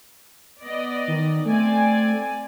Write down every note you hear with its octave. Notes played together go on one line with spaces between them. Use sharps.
B3 D5 D#5
D#3
A3 C4 D5 G#5